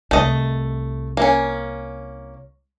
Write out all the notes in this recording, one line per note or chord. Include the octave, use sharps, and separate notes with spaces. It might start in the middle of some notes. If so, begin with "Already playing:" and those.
C2 A3 D#5
A#3 C#4